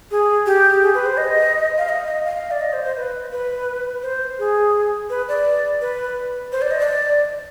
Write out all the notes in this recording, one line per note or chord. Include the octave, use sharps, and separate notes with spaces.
G#4
G4
G#4
B4
C5
D#5
F5
D#5
D#5
F5
D5
D#5
C5
C5
B4
B4
C5
G#4
B4
D5
B4
C5
D5
D#5
D5